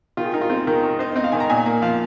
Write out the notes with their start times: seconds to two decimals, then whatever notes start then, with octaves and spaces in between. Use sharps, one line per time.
0.17 D#3 F4
0.25 G#4
0.34 D#4 A#4
0.41 F4
0.50 C4 G#4
0.67 D#3 A#4
0.83 D#3
0.89 A#4
0.99 D#4 C5
1.16 C4 D#5
1.24 F5
1.32 D#3 G#5
1.40 A#5
1.50 A#2 G#5
1.66 A#3
1.82 F3 F5